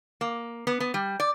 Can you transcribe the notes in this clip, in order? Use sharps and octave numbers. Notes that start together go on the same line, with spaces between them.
A#3
B3
B3
G3
D5